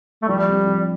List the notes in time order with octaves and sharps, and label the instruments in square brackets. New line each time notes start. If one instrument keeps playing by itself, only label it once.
[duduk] A3
[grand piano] F3 [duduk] G3
[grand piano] C4 G4
F3